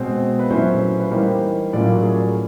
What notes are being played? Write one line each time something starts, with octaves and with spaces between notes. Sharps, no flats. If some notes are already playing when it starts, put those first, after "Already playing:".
Already playing: B2 G#3 C4 C5
B4
A#2 F#3 A3 C#4 E4 C5
B4
E3 G3 A#3 D#4 C5
A2 F#3 A#3 C#4 F4 D5
G#4